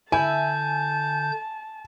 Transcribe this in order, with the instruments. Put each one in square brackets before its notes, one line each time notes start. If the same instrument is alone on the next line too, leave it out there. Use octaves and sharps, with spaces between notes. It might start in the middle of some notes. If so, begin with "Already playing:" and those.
[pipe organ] D3 G6 [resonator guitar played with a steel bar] E4 [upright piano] G#5 [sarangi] A5